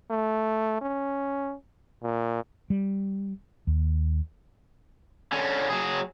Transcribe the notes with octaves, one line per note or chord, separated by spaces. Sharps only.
A3
C#4
A#2
G3
D#2
D3 C#4
F#3 G#4